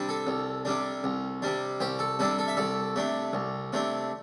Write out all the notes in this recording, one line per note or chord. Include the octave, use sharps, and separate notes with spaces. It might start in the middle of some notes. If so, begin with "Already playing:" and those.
Already playing: C3 G3 D4
A4
C2
C3 G3 D4
C2
C3 G3 D4
C2 G4 C5
A4
C3 G3 D4 A4
A4
E5
C2 A4 D5
C3 A3 D4
C2
C3 A3 D4